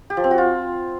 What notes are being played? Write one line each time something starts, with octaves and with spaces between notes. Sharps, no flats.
G4
F3
C4
F#4
F4